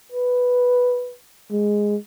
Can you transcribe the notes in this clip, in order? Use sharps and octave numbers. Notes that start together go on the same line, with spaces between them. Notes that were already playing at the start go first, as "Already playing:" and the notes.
B4
G#3